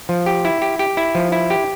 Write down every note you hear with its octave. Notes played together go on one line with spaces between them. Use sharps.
F3
G4
E4
G4
G4
E4
F3
E4
G4